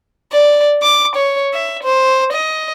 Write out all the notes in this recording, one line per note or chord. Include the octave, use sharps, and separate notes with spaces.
D5
D6
C#5
E5
C5
D#5